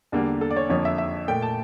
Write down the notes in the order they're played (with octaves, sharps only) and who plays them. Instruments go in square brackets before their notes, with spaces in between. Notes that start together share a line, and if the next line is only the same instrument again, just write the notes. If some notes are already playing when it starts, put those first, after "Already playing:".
[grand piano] E2 D3 G3 A#3
A4
D5
C#5
F2 D3 F3 A#3 C#5
E5
E5
A#2 A3 G5
A5